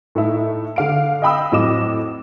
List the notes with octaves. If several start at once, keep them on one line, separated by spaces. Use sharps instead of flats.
A2 A3 D#4 E4
D3 F5 D7
D#5 F5 G5 B5 D#6 E6
F2 A2 F#3 D#5 D6 E7